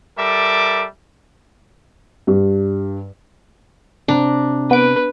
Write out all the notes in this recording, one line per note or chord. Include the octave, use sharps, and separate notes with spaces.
G3 A4 A#4 E5 D6
G2
C3 D4 A#5
B3 B4 D7